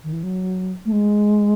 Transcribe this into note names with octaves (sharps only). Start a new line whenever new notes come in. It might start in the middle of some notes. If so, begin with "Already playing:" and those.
D#3
E3
F#3
A3
G#3